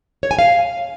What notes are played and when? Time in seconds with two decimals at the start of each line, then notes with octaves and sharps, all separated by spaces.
0.23 C#5
0.31 G#5
0.39 F5